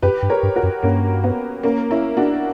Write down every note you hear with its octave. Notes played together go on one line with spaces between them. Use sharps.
F#2 G4 B4
G2
A#4 C#5
G2
F#4 A#4
F#2
G2 A#3 C#4
B3
A#3 C#4
C#4 E4
D4 F#4